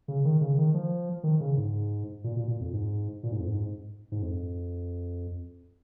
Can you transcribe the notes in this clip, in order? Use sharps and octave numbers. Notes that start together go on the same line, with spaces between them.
C#3
D#3
C#3
D#3
F3
D#3
C#3
G#2
A#2
A#2
A#2
F2
G#2
A#2
G#2
F2
G#2
G#2
F2